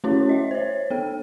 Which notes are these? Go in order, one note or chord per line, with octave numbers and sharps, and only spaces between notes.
A3 C#4 E4 F#4 C#5
D#5 E5
C5 C#5
B3 A4 G5